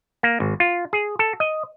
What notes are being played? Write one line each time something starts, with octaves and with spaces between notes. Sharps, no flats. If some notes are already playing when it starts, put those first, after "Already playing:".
A#3
G#1
F4
G#4
A4
D#5